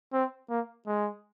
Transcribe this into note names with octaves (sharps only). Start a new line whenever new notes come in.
C4
A#3
G#3